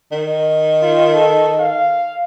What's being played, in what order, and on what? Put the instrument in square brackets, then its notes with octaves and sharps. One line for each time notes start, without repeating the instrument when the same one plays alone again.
[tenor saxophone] D#3
[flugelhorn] F4
A4
F5